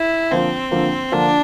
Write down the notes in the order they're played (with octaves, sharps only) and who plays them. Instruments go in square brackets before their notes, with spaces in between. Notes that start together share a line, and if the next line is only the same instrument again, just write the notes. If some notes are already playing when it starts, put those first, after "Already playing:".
Already playing: [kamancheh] E4
[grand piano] D3 F3 A#3 F4 C5 [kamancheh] C4
[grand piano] D3 F3 A#3 F4 C5
[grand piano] D3 F3 A#3 F4 C5 [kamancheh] D4